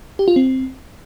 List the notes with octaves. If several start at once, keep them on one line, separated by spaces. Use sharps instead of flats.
G4
F4
C4